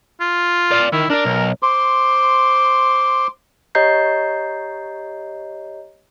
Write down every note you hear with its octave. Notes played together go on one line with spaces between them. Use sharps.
F4
D5 F5
D#3 E4
D4 A#4 D5
B1
C5 C6 D6
G4 C#5 D#5 A#5 G6 C7